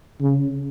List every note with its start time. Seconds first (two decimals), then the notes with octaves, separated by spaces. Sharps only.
0.21 C#3